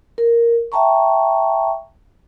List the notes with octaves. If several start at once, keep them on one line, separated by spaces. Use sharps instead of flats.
A#4
E5 G5 A5 A#5 C#6